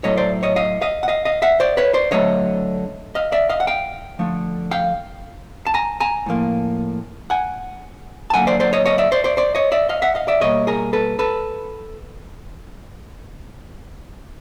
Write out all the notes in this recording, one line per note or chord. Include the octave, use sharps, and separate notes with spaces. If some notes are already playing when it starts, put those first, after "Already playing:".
A2 F#3 A3 C#5 D#5
C5 D5
C#5 D#5
D#5 F5
D#5 F5
F#5
D#5 F5
D#5 F5
E5 F#5
C5 D5
B4 C#5
C5 D5
D3 F#3 A3 C#5 D#5
D#5 F5
D5 E5
D#5 F5
F#5
F5 G5
D3 F3 A3
F5 G5
A5
G#5 A#5
G#5 A#5
A2 F3 A#3
F#5 G#5
A5
D3 F#3 A#3 F#5 G#5
C5 D5
C5 D5
C#5 D#5
C#5 D#5
D5 E5
C5 D5
C5 D5
C5 D5
C#5 D#5
D5 E5
D#5 F5
E5 F#5
D#5 F5
D5 E5
B2 G3 A#3 C#5 D#5
G#4 A#4
A4 B4
A4 B4